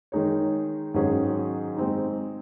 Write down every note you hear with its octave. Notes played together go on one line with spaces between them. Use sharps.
D#3 G#3 D#4 G#4 C#5
G#2 D#3 F#3 C#4 G#4
G#3 C4 D#4